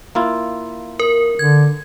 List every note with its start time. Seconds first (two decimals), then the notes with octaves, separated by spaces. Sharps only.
0.15 A#3 E4 F4
0.99 A#4
1.39 D3 G#6